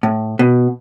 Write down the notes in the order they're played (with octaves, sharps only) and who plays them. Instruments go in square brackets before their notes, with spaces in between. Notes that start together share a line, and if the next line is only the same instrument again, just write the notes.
[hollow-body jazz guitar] A2
B2